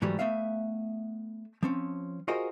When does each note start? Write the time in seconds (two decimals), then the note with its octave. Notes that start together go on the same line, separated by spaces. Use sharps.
0.02 G#2 E3 F#3 G3 A3
0.19 A3 B3 E5 F5
1.63 F3 C4 C#4
2.28 F4 F#4 G#4 A#4 C5 D#5